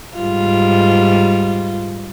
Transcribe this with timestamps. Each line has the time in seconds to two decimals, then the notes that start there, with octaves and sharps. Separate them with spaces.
0.18 G#2 G3 F4